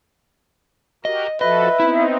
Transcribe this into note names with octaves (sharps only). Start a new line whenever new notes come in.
F#4 G4 A#4 D#5
F3 F#4 A4 B4 D#5 E5
B3 C4 D#4 E4